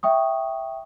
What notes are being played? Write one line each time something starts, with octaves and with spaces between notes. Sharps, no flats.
E5 G5 C#6 D#6